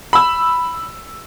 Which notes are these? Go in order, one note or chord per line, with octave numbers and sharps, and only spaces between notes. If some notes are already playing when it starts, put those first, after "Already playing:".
B5 E6